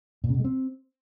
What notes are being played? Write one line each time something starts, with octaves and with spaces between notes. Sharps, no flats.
A#2
C#3
B2
G#3
C4